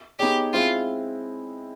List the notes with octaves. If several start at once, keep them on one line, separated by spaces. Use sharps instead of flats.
B3 D#4 G4 G#4 C#5
G#3 C4 E4 F4